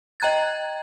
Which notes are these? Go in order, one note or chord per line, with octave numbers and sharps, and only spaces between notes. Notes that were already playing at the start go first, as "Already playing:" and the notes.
D#5 G5 A#5 F#6 G#6 A6